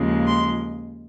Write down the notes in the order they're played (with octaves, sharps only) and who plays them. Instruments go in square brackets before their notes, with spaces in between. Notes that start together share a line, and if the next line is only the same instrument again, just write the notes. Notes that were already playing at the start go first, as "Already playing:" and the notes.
Already playing: [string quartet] D#2 C#3 F3 G#3
C6